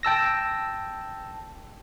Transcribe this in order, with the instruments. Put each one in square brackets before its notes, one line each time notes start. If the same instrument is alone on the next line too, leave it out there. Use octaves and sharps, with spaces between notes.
[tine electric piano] G5 A5 E6 A#6